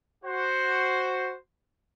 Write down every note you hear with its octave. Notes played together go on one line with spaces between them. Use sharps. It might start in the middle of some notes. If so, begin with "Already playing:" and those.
F#4 C5